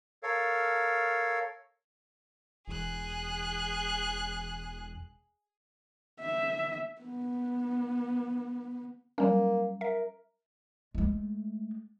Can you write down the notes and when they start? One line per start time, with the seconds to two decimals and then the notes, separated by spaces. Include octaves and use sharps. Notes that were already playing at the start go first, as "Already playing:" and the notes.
0.23 A4 A#4 C#5 F5
2.67 E1 G#4 F#6
6.21 E5
7.01 B3
9.18 F#3 G3 A#3 C#4
9.81 A#4 E5
10.95 G#3 A3